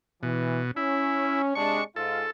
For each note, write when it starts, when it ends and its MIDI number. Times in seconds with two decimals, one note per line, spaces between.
0.23 0.71 47
0.23 0.59 52
0.76 1.54 61
0.76 1.42 64
1.55 1.81 48
1.55 1.81 56
1.55 1.81 62
1.55 1.84 85
1.96 2.25 44
1.96 2.25 65
1.96 2.31 69